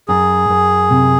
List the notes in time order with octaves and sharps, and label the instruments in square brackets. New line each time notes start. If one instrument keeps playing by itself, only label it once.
[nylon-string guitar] F#2 [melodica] G#4
[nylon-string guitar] F#2
C3